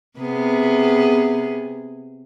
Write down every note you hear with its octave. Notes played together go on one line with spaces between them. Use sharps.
C3 B3 G#4